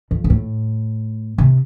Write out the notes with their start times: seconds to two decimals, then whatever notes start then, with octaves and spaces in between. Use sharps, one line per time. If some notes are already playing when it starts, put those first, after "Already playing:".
0.11 F2
0.24 B2
0.30 A2
1.38 C3